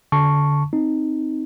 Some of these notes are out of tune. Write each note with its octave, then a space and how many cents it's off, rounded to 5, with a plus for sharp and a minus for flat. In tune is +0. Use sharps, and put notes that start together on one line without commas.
D3 -20 A5 +0 C#6 +0
C4 +0 D#4 +0